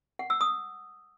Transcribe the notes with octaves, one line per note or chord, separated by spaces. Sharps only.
F#5
E6
D#6